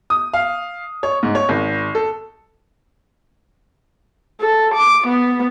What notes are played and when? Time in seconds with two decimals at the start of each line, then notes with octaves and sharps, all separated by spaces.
0.10 D#6
0.33 F5
1.03 C#5
1.23 G#2
1.35 C#5
1.49 G#1
1.95 A4
4.40 A4
4.74 D6
5.07 B3